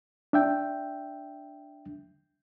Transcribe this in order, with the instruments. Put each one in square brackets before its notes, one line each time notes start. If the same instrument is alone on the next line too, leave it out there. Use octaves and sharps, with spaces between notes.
[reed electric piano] D4 E5 G5